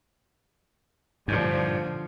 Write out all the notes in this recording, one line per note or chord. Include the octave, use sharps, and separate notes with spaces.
G2 A#2 D3 F3